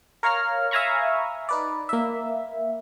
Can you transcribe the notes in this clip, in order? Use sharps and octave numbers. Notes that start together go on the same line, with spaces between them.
A#4 C#5 F5 A#5 F6
E5 F5 G#5 A#5 B5 C#6
D#4 B4 D5
A#3 E5